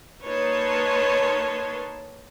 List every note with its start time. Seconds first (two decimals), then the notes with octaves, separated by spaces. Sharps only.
0.25 A#3 D#4 B4 C#5 A5 C6